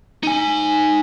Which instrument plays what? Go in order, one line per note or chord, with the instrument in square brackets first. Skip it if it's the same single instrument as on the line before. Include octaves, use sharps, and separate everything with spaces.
[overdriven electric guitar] D#4 G#5